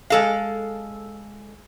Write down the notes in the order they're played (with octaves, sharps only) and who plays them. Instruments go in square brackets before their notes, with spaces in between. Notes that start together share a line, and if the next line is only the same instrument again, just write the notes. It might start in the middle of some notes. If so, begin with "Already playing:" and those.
[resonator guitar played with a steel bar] G#3 A4 F5